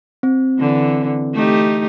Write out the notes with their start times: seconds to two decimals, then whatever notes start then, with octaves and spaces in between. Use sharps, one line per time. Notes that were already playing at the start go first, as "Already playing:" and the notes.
0.23 C4
0.59 D3 E3
1.34 A3 D#4 G4